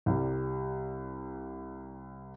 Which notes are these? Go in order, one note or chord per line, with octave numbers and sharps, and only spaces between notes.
C2 G3